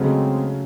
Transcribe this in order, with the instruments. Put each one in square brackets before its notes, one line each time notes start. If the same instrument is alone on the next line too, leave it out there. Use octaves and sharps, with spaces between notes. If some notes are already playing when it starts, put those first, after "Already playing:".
Already playing: [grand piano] C#3 F#3 A3 C#4 [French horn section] G#3 C4